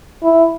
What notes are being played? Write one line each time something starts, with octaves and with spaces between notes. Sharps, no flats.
E4